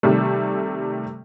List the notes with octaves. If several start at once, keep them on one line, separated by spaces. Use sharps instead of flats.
C3 D#3 G3 A3